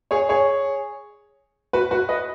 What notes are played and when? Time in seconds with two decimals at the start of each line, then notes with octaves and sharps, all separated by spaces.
0.11 G#4 C#5
0.29 G#4 C#5
1.73 F#4 B4
1.91 F#4 B4
2.09 B4 D#5